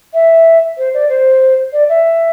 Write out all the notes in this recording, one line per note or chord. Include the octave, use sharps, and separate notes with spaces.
E5
C5
D5
C5
D5
E5